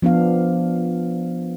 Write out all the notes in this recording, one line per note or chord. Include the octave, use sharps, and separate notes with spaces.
F3 B3 D4 F5